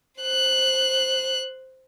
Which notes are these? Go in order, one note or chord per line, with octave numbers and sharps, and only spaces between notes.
C5 F#6